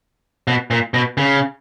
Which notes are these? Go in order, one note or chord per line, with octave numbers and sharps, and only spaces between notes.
B2
A#2
B2
C#3